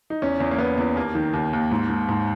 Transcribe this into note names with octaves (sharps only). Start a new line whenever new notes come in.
D#4
E2 C#4
E2
A#3
E2 B3
E2
D#2 A#3
D#3
D#2
D#2
G#2
G#2
G#2